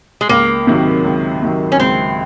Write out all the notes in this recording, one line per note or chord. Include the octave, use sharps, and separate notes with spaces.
G#3
C#2 A#3
C3 D#3 F#3
C#2
C3 D#3 F#3
C#4
C#2 C4